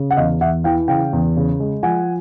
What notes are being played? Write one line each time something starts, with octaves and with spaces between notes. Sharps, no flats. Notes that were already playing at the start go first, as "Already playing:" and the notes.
Already playing: C#3
F#5
E2 D#5 F5
E2 E5 F#5
E3 F5 G5
C#3 F5 G5
E2
C#3
G#3
F3 F#5 G#5